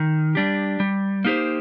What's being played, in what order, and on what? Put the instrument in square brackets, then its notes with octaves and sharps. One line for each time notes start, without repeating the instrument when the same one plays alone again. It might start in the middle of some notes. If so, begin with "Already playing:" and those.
Already playing: [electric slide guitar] D#3
G3 D4 G4
G3
A#3 D#4 G4 C5